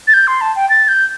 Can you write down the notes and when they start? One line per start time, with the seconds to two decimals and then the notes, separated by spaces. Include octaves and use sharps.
0.07 A6
0.14 G6
0.27 C6
0.41 A5
0.56 G5
0.70 A6
0.88 G6